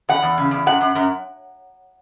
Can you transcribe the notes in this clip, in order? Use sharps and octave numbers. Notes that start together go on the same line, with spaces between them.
E2 F#5
E2
C#3
E2
F#2 F#5
F#2
F#2